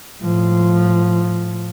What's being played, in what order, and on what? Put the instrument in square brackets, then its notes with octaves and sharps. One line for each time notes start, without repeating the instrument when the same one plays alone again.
[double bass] A2 F3